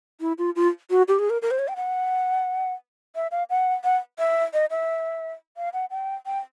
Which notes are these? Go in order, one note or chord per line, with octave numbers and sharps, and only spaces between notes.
E4
F4
F4
F#4
G4
G#4
A#4
A#4
C5
C#5
G5
F#5
E5
F5
F#5
F#5
E5
D#5
E5
F5
F#5
G5
G5